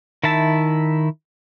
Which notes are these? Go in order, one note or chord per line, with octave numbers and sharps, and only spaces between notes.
D#3 E4 E5 A5